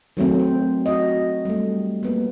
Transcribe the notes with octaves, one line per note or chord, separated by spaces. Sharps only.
D#3 F#3 A3 C4
C5
F#4 D#5
G3 A3
A#3 B3